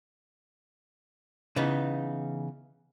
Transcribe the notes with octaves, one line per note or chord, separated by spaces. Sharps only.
C#3 E3 B3 D#4